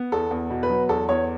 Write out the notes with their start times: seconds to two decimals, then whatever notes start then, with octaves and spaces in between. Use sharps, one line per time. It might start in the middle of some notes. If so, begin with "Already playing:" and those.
Already playing: B3
0.12 E2 A4
0.31 E2
0.50 B2
0.63 B4
0.70 F#3
0.89 E2 A4
1.09 E2 C#5